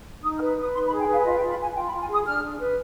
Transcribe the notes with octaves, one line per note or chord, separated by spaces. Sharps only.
D#4 D#6
F6
B4
B4 D#6
D#4 C6
B5
G#4
G5
B4 F5
F4 D#5
F5
G5
F4
B5
F4 G#5
F4 G5
B5
F4
G#5
G#4 D#6
D4 F6
D4
B4